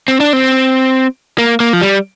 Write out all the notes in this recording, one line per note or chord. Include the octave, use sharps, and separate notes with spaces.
C4
D4
C4
A#3
A#3
F3
G3